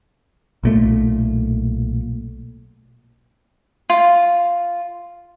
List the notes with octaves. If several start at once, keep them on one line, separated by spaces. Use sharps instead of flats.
B1 A#2 A3
F4